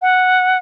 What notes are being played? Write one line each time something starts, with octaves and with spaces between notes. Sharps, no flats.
F#5